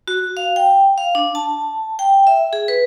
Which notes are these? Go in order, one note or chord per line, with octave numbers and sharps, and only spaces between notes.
F#4
F5
G5
F5
D4
A5
G5
E5
G#4
B4